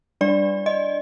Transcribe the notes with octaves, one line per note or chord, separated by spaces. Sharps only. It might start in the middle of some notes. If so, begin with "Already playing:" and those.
G3 D4 D5
D#5